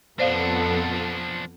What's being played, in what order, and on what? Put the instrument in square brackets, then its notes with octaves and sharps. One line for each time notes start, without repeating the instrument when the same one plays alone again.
[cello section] F2 B3 A4 [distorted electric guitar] F3 D4 [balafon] C5 D5 F5